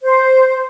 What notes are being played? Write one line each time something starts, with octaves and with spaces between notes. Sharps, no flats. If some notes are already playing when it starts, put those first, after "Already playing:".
C5